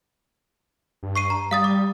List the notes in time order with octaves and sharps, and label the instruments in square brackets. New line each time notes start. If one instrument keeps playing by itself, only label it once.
[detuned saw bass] G2
[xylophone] C#6 C7 D#7
A#5
[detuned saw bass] G3 [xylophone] F5 D#6 A6
[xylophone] D6